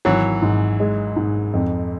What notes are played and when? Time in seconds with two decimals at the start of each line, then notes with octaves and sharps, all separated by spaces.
0.05 G#1 E3 F#3
0.42 G#2
0.80 G#3
1.16 G#2
1.54 F2